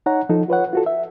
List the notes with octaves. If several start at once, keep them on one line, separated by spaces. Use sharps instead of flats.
D#4 C#5 F#5 A#5
F3 D#4 A4
F4 B4 C#5 F#5
F4 F#4 A4
E5